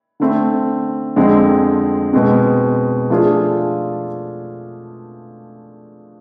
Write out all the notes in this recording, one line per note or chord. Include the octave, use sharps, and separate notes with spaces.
D3 A3 C4
F2 D3 G#3 C4
B2 G#3 C4
F3 A3 D4 F4 G#4